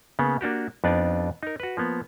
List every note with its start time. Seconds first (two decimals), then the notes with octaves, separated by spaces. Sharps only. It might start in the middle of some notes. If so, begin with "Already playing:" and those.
0.19 C#3 A#3 B3
0.41 A#3 D4 F#4 G4
0.84 F2 B3 D4 D#4 F4 D5
1.43 D#4 A#4
1.60 F#4 B4
1.77 F3 A#3 B3